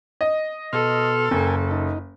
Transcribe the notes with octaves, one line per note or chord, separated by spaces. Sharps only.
D#5
B2 A4 C6 F6
F#1 A#4 G5 G#5
D#4